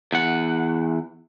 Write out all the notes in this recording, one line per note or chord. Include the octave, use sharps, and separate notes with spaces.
E2 F#5